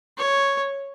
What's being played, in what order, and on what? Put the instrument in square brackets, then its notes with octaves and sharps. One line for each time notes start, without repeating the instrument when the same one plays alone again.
[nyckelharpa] C#5